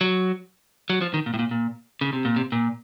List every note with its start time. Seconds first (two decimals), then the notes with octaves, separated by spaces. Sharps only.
0.01 F#3
0.90 F#3
1.01 F3
1.14 D#3
1.26 A#2
1.34 A2
1.39 A#2
1.51 A#2
2.01 C#3
2.13 C3
2.25 A#2
2.36 C3
2.52 A#2